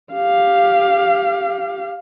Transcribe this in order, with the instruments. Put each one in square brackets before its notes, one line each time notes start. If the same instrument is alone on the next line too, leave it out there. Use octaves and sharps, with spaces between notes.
[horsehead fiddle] G4 F5